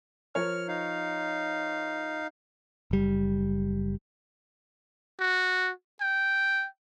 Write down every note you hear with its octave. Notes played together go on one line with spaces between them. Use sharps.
F3 A#4 C#5 F6
D#4 F5
F#1 G3
F#4
G5